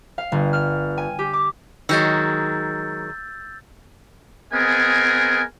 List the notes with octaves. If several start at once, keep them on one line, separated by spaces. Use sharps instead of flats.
F5
G1
F6
G#5
G4
D6
D#3 F#3 G#3 E6 G6 A6
B3 C4 G#4 A#4 D#5 G#5